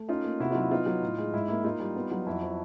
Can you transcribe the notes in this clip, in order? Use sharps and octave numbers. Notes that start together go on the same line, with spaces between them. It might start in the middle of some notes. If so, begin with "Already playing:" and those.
Already playing: A3
C#4 D#4 F4
A#3
C3 E4 F#4
F#3 D#4 F4
E4
B3 D#4 F4
F#3
A2
G#3
G#2 E4
A#3 E4
A#3 D#4 F4
G3
B3
F#3
F2 E4 F#4
F3